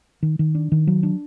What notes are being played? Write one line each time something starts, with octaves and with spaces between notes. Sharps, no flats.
D#3
D#3
D4
D#3
F#3
D4